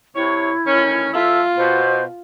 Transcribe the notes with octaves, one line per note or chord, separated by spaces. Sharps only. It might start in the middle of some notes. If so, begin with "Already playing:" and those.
C3 E4 C#5
D2 D#3 C#4
F3 F4 A4 E5
B2 C5